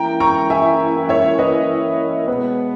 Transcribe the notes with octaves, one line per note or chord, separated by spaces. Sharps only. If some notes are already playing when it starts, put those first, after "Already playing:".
Already playing: E3 A#3 C#4 E4 G5 A#5
A#5 C#6
E5 G#5
C#5 E5
B4 D#5
B2 G#3 B3 B4